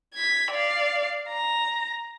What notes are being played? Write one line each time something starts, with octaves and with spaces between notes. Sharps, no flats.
G#6 B6
D5 F5
A#5